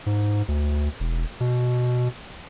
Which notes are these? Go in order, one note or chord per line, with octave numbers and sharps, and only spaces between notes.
G#2
D2
E1
B2